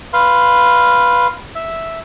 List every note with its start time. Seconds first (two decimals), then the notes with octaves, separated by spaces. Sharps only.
0.13 B4 F5 C6
1.55 E5